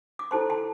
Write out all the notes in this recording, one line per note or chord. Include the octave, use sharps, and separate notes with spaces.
D6
E4 A4 C5 A5 C6
A5 C6